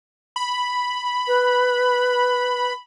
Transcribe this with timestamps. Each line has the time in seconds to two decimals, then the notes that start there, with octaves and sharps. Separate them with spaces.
0.36 B5
1.28 B4